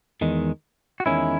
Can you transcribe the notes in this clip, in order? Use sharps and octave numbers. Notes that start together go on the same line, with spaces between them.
E2 D#3 G#3
F#4
E2 D#3 G#3 C#4 E4